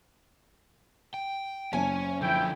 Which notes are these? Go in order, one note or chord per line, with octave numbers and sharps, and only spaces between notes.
G5
F#1 C#4 G#5
D3 F3 E4 G5